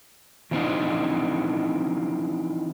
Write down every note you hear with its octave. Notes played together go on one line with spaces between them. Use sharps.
E3 F3 C4 D4 D#4